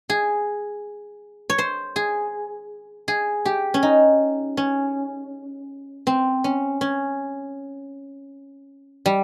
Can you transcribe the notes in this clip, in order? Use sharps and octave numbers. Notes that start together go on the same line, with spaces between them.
G#4
C#5
C5
G#4
G#4
G4
C#4
D#4
C#4
C4
C#4
C#4
G3